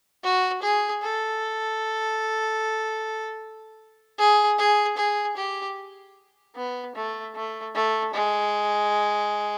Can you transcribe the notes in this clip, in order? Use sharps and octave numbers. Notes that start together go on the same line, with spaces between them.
F#4
G#4
A4
G#4
G#4
G#4
G4
B3
A3
A3
A3
G#3